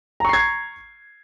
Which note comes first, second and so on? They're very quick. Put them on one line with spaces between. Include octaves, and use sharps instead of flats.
A#5 C#6 C7 G#6